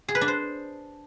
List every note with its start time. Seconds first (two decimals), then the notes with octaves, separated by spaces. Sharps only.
0.08 G#4
0.15 B4
0.21 D4
0.28 C5